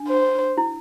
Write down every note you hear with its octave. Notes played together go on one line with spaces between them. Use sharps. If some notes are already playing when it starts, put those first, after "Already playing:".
Already playing: D4
C5
E4